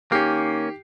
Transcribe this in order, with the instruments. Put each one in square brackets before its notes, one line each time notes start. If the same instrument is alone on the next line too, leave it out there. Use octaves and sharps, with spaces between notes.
[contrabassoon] D#3 [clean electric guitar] A#3 C#4 [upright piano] G4 C7